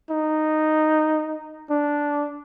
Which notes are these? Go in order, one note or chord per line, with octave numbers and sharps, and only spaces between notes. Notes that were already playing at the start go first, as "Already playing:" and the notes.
D#4
D4